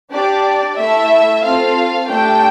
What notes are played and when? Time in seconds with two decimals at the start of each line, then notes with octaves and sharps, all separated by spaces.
0.12 D4 G4 D5
0.77 A3 E4 A4 E5
1.42 C4 F4 A4 F5
2.07 A3 D4 G4 G5